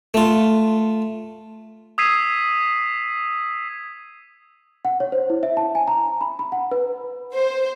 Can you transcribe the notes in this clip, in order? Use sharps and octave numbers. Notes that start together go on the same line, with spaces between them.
A3 F4
D#6 E6 G#6 B6 C7 D#7
F#5
C#5
C5
E4
E5
A5
G#5
A#5
B5
B5
F#5
B4
C5